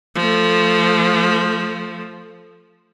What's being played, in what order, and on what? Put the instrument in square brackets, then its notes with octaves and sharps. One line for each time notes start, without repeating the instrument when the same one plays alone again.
[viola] F3 A3